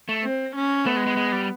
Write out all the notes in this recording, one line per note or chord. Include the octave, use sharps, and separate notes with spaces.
A3
C4
C#4
A3 B3
G#3
G#3
G#3
G3